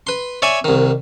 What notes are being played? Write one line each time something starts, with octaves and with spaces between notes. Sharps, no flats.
B4 C6
C#5 D5 E5 G#5
C2 D#3